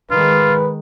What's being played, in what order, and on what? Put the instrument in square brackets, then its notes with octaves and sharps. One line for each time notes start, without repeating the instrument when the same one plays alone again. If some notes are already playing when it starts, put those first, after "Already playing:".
[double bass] D#3 G#3 [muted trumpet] F4 [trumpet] B4